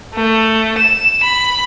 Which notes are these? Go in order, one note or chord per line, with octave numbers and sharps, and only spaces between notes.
A3
E7
B5